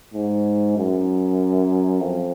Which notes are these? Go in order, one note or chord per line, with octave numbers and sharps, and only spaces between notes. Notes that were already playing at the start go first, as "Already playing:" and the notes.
G#2
F#2
F2